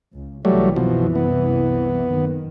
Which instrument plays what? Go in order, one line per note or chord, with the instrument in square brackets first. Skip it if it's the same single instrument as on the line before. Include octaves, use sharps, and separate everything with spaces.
[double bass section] C#2
[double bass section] C2 F#2 E3 [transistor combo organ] F#3 G3 A3
[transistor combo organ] B2 F3
B3
[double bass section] F#1 D#3